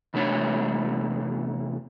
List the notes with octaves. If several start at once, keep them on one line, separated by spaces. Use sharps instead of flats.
E2 C3 A3 D4 C#5